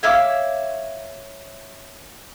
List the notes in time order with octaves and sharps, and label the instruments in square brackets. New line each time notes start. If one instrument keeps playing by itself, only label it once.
[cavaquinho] C#5 E5 F5 D6